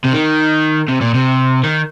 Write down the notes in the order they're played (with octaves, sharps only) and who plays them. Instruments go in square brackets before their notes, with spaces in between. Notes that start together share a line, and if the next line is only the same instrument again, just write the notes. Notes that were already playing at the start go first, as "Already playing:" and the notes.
[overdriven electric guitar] C3
D#3
C3
A#2
C3
D#3